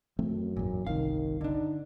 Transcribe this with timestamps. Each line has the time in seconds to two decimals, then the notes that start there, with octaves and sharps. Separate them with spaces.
0.19 F#2 F3 A3 C4
0.57 G#1 E2 A#2
0.87 G1 C2 C3 D#3 F5
1.41 D3 D4 D#4